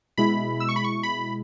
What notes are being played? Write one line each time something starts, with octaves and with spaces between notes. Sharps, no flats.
B2 G#3 E4 B5
E6
C#6
B5
C#6
B5